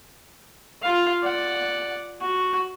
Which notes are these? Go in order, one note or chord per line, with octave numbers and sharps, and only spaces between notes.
F4 F5
D5 F#5
F#4